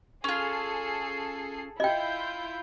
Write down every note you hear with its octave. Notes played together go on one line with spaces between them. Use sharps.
C#4 F4 G#4 A4 C7
E4 F4 D#5 G5 G6